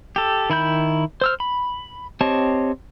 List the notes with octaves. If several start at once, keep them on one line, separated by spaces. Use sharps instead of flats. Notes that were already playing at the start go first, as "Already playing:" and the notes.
G4 A4
D#3 E4 B5 G6
C5 E6 F6
B5
C4 G4 C#5 D#5 A5